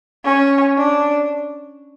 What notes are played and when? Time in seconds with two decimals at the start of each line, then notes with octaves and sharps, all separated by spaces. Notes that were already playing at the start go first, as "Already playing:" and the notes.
0.25 C#4
0.77 D4